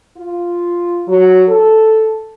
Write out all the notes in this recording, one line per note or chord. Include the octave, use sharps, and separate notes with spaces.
F4
F#3
A4